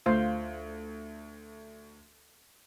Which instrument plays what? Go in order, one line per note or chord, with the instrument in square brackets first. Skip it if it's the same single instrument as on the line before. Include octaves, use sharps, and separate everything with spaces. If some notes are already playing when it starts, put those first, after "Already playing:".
[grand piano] D2 [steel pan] F4 C5 F5